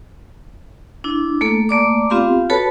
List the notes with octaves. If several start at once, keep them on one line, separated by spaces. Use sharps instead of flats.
D4 E4
A3 A#3 A4
A3 A#3 D5 D6
B3 C4 F4 G4 F5 C6
F#4 A4 B4 C#5 A5 B5